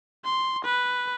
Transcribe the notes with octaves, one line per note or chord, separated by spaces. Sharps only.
C6
B4